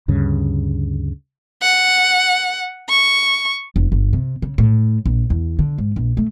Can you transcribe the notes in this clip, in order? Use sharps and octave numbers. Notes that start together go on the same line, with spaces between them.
D2 G2 C#3
F#5
C#6
F1
G1
C3
C#3
A2
A#1
E2
D3
G#2
A#1
A3